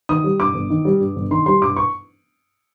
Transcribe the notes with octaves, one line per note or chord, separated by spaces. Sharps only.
D#3 D#6
G3
G2 D6
G1
D#3
G3
G2
G1
D#3 C6
G3 C6
G2 D6
C#6